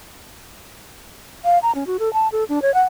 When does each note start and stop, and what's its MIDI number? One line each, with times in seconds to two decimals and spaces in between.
1.45 1.58 77
1.63 1.72 82
1.75 1.87 61
1.87 1.97 66
1.99 2.12 69
2.13 2.28 81
2.32 2.44 69
2.49 2.62 62
2.62 2.73 73
2.74 2.83 78